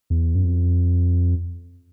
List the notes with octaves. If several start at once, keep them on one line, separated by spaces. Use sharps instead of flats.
E2
F#2
F2